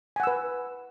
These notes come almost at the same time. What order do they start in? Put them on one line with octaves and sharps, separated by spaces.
G#5 F#5 E6 B4